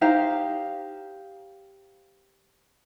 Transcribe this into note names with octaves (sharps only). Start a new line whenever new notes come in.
D#4 G4 C5 F5